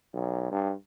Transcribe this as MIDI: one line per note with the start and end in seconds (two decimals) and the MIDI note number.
0.13 0.49 35
0.51 0.73 43